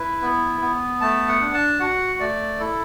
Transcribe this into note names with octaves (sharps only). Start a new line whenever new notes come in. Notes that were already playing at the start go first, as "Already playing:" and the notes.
Already playing: E4 B4
B3
B3
A3 A5
F#5
D4
A5
F#4 F#5
A3 D5
E4 A4